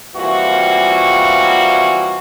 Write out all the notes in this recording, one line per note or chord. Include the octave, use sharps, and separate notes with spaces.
E3 G3 A#3 C4 F4 F#4